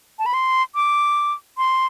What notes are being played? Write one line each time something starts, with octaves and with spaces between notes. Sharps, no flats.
A5
B5
C6
D6
C6